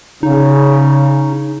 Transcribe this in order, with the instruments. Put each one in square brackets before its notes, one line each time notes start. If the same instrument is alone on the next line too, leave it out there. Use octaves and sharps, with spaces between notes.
[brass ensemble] C#3 [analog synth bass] D#4